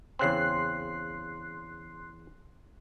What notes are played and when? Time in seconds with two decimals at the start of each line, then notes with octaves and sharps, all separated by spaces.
0.19 E2 C#3 C4 C6 F#6 C7